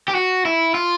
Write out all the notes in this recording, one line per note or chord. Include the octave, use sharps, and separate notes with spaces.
G4
F#4
E4
F4